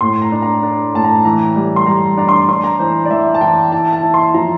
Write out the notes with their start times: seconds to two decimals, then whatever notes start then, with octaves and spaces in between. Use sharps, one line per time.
0.01 A2 C6
0.22 A#5
0.32 D4
0.43 A#5
0.63 D4
0.94 A2 A5
1.04 A#5
1.25 E3 A#5
1.56 G3
1.76 C6
1.86 G3 A#5
2.17 D4 A#5
2.29 C6
2.49 D4 C6
2.64 A#5
2.79 E3 C5
3.05 D5
3.10 E3 E5
3.35 A5
3.41 E3 G5
3.72 E4 A5
3.93 A5
4.03 E4
4.14 C6
4.34 F3 A#5